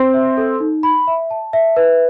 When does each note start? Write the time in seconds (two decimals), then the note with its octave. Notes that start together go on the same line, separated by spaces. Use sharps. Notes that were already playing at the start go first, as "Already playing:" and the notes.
Already playing: C4
0.14 E5
0.37 A4
0.60 D#4
0.83 B5
1.07 E5
1.31 A5
1.53 E5
1.76 B4